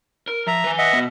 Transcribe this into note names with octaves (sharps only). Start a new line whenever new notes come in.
A#4
F3 E5 A#5
B4 G#5
D#5 E5 F#5
B2 B3